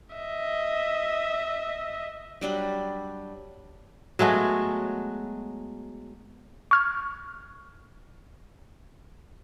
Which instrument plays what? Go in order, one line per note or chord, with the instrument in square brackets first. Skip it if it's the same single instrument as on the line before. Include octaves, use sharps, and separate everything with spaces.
[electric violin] D#5 E5
[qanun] F#3 G3 D4 B5
[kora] F#3 G#3 A3 B3
[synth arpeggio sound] C#6 F6 G#6